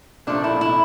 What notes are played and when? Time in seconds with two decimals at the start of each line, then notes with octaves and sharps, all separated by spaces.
0.27 A#2 F3 A3 D4
0.44 E4
0.61 E4